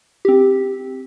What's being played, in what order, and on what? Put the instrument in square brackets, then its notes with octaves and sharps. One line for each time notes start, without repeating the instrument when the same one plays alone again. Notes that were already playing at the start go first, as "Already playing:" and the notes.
[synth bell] C4 G4